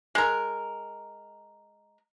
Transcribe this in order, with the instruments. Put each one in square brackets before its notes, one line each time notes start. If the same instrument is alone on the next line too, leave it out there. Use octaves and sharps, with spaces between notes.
[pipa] G#3 A#4